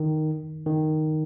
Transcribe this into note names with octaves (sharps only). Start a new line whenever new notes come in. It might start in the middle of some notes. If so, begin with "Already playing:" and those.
Already playing: D#3
D#3